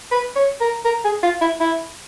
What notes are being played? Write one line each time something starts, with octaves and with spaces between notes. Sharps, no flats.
B4
C#5
A#4
A#4
G#4
F4
E4
E4